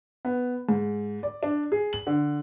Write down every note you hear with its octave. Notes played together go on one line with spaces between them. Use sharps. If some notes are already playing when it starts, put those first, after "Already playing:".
B3
G#2
D5
D4
G#4
F#7
D3